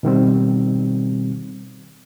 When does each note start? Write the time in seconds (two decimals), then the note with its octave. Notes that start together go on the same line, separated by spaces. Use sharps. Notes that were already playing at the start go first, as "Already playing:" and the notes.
0.03 B2 D#3 G3 C4